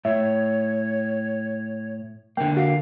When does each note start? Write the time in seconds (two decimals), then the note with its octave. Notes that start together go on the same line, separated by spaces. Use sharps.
0.05 A2 C#5 E5
2.37 D3 A#3 G5
2.57 F#4 F5